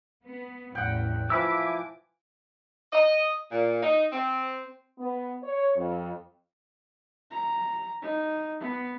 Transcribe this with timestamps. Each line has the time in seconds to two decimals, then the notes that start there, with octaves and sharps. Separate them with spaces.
0.25 B3
0.75 A1 E2 F#5 G5
1.30 E3 F3 E5 G#5 B5 D6 E6
2.92 D#5
3.52 A#2
3.81 D#4
4.12 C4
4.98 B3
5.42 C#5
5.75 F2
7.31 A#5
8.02 D#4
8.60 B3